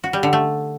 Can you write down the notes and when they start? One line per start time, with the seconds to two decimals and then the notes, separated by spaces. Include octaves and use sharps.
0.04 F#4
0.13 G3
0.23 D3
0.33 A3